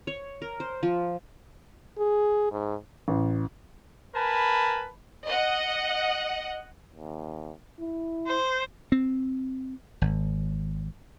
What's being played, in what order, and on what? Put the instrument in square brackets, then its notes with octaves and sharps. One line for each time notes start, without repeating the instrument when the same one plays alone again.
[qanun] C#5
A#4
C5
F3
[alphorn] G#4
G#2
[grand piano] A1
[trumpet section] A#4 B4 G#5 A5 B5
[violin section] D#5 F#5
[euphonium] D#2
E4
[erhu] C5
[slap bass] C4
G#1